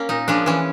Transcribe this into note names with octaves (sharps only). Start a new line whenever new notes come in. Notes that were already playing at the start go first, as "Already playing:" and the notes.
Already playing: A#3 C#4
A#2 D#4
F3 G#3 C#4 D4
E3 C#4